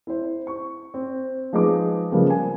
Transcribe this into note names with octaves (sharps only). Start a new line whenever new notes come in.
E4 C5
C#6
C4
F3 G#3 D#4 B4 D6
C#3 F3 G3 G#3 A#3 B3
G#5